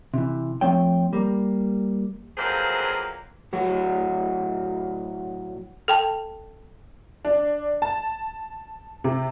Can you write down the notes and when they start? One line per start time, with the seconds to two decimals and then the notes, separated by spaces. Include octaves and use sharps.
0.14 C3 E3
0.61 F2 F3 A3 C4 C#5 G5
1.13 G3 A#3
2.38 F2 F#3 A#3 G#4 B4 C5
3.53 A2 F#3 F#4
5.88 A4 G5 A5
7.25 D4
7.82 A5
9.04 C3